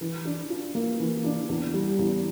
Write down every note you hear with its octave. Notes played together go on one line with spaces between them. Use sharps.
E3
D4
F4
A#3
E3
D4
E2
G3
E2